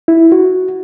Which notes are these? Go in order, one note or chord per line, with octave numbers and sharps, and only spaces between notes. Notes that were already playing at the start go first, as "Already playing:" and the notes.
E4
F#4